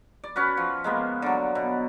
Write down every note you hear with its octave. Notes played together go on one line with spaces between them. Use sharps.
D5
C#4 F#4 B4
F3
G#3 A#3 B3
D3 F#3
B2